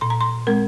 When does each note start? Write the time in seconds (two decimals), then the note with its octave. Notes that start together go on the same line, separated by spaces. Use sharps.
0.01 A#2 C6
0.10 A#5
0.21 C6
0.47 G#3 C4 A#4